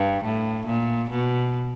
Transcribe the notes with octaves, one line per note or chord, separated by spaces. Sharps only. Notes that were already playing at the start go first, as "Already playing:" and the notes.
Already playing: G2
A2
A#2
B2